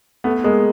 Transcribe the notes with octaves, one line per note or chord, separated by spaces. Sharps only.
A3 B3
G#3 A#3